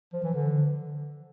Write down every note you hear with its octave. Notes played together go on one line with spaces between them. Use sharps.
F3
E3
D3